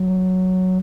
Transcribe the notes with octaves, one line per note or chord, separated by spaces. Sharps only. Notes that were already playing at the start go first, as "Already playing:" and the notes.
Already playing: F#3